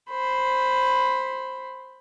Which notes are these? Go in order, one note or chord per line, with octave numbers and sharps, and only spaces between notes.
C5 B5